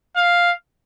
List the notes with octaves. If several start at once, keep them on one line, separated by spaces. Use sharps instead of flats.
F5